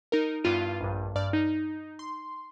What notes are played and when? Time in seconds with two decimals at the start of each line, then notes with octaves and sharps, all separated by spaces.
0.12 D#4 A#4
0.44 G2 B3 E4 F4 D#7
0.81 A#1 G2
1.15 G2 D5 F6
1.33 D#4
1.99 C6